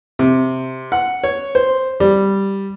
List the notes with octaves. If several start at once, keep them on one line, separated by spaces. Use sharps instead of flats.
C3
F#5
C#5
C5
G3